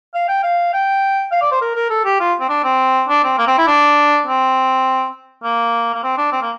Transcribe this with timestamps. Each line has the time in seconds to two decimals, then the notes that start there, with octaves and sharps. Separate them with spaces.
0.15 F5
0.29 G5
0.43 F5
0.74 G5
1.32 F5
1.42 D5
1.52 C5
1.62 A#4
1.76 A#4
1.90 A4
2.05 G4
2.20 F4
2.41 C4
2.49 D4
2.64 C4
3.09 D4
3.24 C4
3.38 A#3
3.47 C4
3.58 E4
3.67 D4
4.27 C4
5.44 A#3
5.95 A#3
6.04 C4
6.18 D4
6.32 C4
6.42 A#3